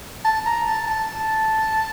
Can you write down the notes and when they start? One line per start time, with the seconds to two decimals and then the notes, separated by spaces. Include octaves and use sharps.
0.25 A5
0.46 A#5
0.68 A5
0.88 A5